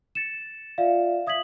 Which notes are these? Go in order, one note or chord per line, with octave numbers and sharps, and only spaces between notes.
A6 C#7 E7
F4 D5 E5 F5
E5 D#6 G#6 B6 F#7